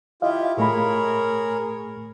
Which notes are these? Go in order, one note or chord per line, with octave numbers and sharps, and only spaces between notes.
E4 F4 G4 D#5 F5
A2 A3 G#4 A#4 C#5 B5